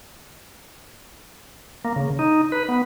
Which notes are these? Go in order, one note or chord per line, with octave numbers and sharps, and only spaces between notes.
A#3
C#3
D#4
B4
B3